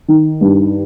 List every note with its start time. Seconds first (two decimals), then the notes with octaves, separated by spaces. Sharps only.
0.08 D#3
0.41 G2